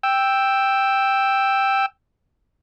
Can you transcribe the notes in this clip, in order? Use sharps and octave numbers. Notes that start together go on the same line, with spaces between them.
G5 E6